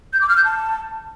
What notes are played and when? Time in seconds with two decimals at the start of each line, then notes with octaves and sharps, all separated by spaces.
0.13 G6
0.21 D6
0.29 F6
0.37 G6
0.45 A5